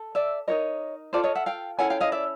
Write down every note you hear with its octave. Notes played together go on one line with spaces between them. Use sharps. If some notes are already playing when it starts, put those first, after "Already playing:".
Already playing: A4
D5 E5
D#4 G4 A#4 C#5 D#5
F4 A4 C5 D5
C#5 D#5
E5 F#5
F5 G5
C#4 E4 A4 F#5 G#5
F5 G5
D#5 F5
D5 E5